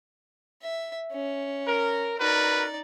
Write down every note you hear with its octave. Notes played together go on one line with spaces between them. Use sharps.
E5
C#4
A#4
D#4 F#4 A#4 B4 D5